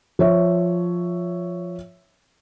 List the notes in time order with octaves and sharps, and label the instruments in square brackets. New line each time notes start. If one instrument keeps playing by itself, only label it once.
[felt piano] F3 C#5 E5